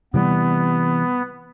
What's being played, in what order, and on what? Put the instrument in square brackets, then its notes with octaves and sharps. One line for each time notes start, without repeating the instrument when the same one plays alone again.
[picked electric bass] C3 E3 G3 [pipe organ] B3